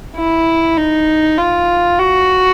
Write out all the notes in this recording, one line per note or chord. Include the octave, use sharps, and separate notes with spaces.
E4
D#4
F4
F#4